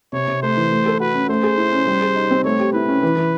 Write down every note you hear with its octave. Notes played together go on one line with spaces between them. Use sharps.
C3 C#5
C3
A3 C5
E3
A3
A4
F#4 B4
C#4
A3 C5
G#4
E4
C#4
G3
G#4
D#4
C4
A3 C#5
G4
E4 B4
C#4
E3
E3